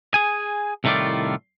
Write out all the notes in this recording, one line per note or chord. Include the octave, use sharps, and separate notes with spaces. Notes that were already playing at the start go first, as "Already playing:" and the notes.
G#4 G#5
C2 A2 D#3 A3 F4 D5